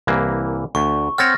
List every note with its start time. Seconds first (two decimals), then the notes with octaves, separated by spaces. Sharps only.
0.07 C2 E3 A#3
0.75 D2 C#6
1.18 C4 C#5 F#5 F6 A6 A#6